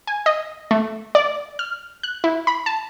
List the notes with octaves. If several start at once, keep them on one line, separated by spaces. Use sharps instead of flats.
G#5
D#5
A3
D5
F6
F#6
E4
B5
A5